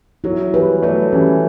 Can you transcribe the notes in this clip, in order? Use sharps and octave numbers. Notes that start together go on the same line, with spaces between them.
F#3 E4
E3 G3 B4
F#3 A3 D5
E3 G3 C#4